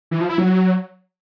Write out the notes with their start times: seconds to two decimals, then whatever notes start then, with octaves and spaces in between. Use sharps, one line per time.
0.11 E3
0.20 F3
0.29 E4
0.38 F#3